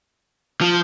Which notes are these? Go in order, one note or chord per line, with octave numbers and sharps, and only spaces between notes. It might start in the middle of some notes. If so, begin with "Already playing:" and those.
F3